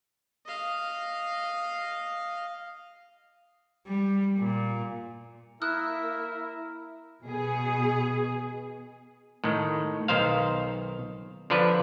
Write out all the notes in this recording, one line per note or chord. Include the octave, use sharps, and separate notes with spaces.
D#5 F5
G3
A#2
A#3 E4 A#4 E5 D#6 F6 F#6
B2 G#4
A2 D#3
B1 D#3 C5 F5
D3 F3 D4 B4